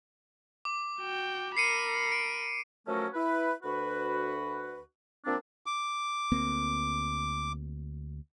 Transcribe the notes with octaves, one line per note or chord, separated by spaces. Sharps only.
D6
F#4 G5
A#4 B5 C7 C#7 D#7
D7
F3 F#3 A3 C#4 A4 A#4
E4 B4
D2 F#4 B4
F3 A#3 C4 D4
D6
D2 A#3 C4